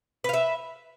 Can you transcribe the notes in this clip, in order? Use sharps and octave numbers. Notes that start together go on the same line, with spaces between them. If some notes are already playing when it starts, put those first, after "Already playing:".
B4 E5 F5